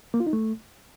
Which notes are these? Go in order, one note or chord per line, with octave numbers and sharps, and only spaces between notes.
A#3
F4
D#4
A3